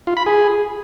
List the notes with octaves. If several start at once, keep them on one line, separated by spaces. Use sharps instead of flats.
F4
B5
G#4